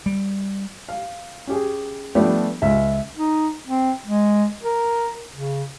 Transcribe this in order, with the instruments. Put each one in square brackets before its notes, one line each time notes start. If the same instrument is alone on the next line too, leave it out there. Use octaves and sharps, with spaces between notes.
[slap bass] G3
[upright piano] F5
C#4 G4 G#4
F3 G3 A3 B3 D4 G4
C#2 E5
[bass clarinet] D#4
C4
G#3
A#4
C#3